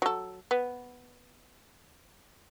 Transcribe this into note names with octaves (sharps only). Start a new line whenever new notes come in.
F#3 A4
B3